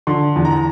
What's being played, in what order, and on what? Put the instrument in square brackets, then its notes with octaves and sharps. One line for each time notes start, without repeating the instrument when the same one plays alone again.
[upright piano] D3 C6
E2
A#5